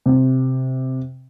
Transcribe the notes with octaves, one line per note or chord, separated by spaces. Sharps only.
C3